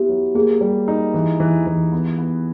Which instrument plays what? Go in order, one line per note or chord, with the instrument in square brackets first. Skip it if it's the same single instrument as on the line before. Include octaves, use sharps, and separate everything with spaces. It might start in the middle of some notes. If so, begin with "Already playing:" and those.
Already playing: [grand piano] B3 E4 [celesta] G4
[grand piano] F#3
[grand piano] A#3 [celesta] G#4
[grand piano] G3
D#4
E3
E3
E3
B3
B3